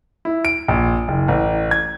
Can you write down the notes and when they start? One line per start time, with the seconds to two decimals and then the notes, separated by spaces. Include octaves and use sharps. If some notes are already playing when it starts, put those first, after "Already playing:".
0.25 E4
0.45 D7
0.68 A#1
1.08 F#1
1.28 A1
1.71 G#6